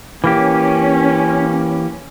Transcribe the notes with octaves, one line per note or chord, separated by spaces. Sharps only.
E3 A#3 C#4 G4